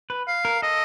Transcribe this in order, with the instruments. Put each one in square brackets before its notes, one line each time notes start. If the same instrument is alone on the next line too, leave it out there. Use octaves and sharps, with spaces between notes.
[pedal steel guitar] B4
[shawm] F5
[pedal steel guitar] A#4
[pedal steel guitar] A4 [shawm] D#5